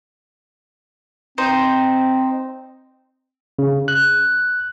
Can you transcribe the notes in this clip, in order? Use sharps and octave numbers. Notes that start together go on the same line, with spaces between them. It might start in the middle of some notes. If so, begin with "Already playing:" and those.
C4 D#4 C5
C#3
F#6